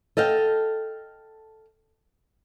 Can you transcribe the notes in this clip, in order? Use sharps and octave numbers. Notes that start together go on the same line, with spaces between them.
A4 D#5 F5 G5